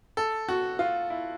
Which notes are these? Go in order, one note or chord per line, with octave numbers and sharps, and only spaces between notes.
A4
F#4
F4
E4